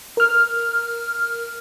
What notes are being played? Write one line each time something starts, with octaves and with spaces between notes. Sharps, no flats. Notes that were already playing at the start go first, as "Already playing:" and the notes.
A#4 F6